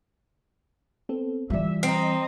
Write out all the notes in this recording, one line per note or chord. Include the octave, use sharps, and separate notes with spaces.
B3 C4 A4
E3 G3 F4 D5 E5
C4 D#5 A#5